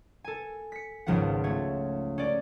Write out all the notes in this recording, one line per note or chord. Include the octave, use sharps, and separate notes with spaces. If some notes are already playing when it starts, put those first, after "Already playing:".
A4 G#5
B6 C#7
G#1 C#2 F3 B3 F#5
A3 C#5
C#4 D5